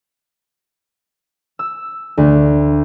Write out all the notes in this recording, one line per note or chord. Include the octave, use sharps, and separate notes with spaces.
E6
D2